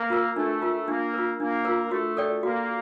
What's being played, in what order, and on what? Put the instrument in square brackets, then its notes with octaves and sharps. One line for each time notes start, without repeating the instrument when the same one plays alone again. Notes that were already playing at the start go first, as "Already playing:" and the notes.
Already playing: [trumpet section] A#3
[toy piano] F4 A#4
[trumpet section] A3 [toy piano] D4
[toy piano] F4 A#4
[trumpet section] A#3 [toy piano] D4
[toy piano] F4 A#4
[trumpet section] A#3 [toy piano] D4
[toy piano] F4 A#4
[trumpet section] A3 [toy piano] F#4
[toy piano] A4 D5 G5
[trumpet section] A#3 [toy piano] F#4